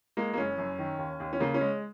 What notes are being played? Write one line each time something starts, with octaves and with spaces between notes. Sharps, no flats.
G#3 A#3
A#3
F#1 C#4
F#2
D#3
D#2
D#2
C#4
C#3 A#3
C#4
G#3